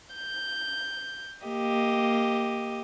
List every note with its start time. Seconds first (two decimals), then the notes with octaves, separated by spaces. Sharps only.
0.15 G6
1.47 A#3 G4 D#5